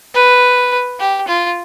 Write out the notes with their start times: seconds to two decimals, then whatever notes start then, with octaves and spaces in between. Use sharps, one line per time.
0.14 B4
1.00 G4
1.28 F4